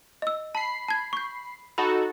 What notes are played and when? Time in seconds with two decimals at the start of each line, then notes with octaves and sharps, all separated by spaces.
0.22 D#5 E6
0.55 A5 B5 C7
0.88 A5 G#6
1.13 C#6 G6
1.78 D#4 F#4 A4 B5